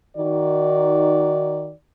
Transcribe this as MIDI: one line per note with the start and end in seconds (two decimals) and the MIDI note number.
0.16 1.72 51
0.16 1.72 63
0.16 1.72 66
0.16 1.72 74